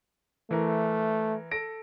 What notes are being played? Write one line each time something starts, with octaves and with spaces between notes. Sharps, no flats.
E3 A3 A#4
A4 A#6 D7